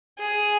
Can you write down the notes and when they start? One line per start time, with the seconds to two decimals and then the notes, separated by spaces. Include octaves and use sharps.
0.19 G#4